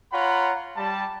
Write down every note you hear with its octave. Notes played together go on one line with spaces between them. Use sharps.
F4 C#5 F#5 A#5 B5
G3 A5